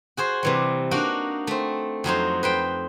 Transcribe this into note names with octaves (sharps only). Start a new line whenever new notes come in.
F#4 G#4 C5
C3 E3 G3
A#3 D4 D#4 F#4
A3 C4
F2 F#3 D#4 C5
B4 C5 G5